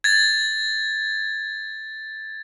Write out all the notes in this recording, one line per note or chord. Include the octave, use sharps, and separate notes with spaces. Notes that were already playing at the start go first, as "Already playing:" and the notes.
G#6 A6